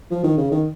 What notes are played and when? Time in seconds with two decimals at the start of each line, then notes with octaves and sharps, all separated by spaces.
0.11 F3
0.24 D#3
0.37 C#3
0.51 D#3